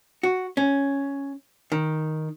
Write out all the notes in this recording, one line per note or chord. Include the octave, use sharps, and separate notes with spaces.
F#4
C#4
D#3